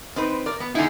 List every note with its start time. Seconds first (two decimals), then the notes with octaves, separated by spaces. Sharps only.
0.16 C4 D#4 B4
0.46 A#4 D5
0.60 B3
0.75 D3 D#4 E4 G#4